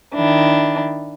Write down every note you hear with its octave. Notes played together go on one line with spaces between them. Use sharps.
D#3 D4 E4